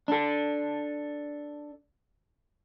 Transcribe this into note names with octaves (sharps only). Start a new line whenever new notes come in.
D4 A4